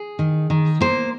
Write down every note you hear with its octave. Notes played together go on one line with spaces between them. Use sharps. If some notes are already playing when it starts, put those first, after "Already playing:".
Already playing: G#4
D#3
D#3
A#3 C5